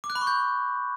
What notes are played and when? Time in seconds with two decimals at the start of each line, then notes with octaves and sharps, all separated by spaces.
0.04 D6
0.10 F#6
0.15 B5
0.21 C#6
0.27 G6